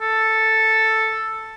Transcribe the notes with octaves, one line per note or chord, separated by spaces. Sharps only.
A4